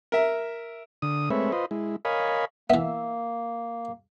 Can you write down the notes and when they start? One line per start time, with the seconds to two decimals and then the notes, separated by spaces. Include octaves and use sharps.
0.12 A#4 E5
1.02 D3 D#6
1.30 G#3 A3 C4 B4 C#5 E5
1.52 F4 B4 C5 D#5
1.71 G#3 E4
2.05 A#4 C#5 D#5 F5 G#5 B5
2.70 E3 A#3 B3 E5